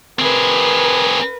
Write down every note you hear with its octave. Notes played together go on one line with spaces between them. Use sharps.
C4 G#4 A#4 B4